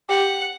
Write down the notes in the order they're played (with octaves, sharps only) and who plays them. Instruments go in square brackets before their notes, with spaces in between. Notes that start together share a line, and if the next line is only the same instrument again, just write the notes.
[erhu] G4 [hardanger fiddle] F#5